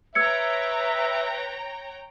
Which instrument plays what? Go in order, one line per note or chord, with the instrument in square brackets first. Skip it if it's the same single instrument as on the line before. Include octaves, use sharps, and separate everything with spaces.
[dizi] B4 [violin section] C#5 G5 A#5 [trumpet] E5 [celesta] E6 G#6 C#7